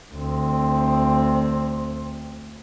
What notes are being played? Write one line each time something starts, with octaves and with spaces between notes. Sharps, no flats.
D2 C4